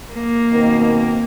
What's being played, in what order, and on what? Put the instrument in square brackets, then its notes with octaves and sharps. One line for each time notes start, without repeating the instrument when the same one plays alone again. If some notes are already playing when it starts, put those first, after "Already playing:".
[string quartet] A#3
[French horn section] B2 D#3 C4